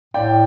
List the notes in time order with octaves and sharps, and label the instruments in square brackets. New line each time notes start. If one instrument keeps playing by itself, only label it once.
[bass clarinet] A2 [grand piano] D5 G5